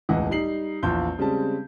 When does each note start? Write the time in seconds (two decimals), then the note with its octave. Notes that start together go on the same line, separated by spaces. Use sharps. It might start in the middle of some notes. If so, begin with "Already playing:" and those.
0.09 E1 C#2 A2 E3 D#5 F#5
0.31 G3 D#4 C7 F#7
0.83 A#1 E2 F4 C6 G6
1.18 C#3 G3 G#3 C4 A5